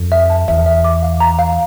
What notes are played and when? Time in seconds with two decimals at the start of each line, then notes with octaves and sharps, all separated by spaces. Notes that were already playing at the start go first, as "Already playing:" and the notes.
Already playing: F2
0.12 E5
0.30 A5
0.48 E2 E5
0.66 E5
0.84 D6
1.03 F5
1.20 A#5
1.39 F5